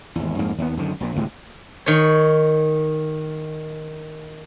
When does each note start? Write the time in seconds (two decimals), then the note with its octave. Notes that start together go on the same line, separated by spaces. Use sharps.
0.16 G#1 E2
0.38 F2 G#2 A#3
0.58 D#2 B3
0.77 F#2 D3 D#3
1.00 A#1 A#2
1.16 D2 A2 C3 G#3
1.86 D#3 C#5